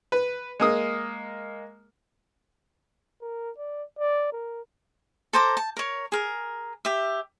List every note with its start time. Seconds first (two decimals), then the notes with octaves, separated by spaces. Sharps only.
0.12 B4
0.60 G#3 A#3 D#6
3.22 A#4
3.58 D5
3.99 D5
4.32 A#4
5.33 A4 C5 A#5 D6
5.57 A5
5.77 A#4 C#5
6.12 G#4 A#4
6.85 G4 E5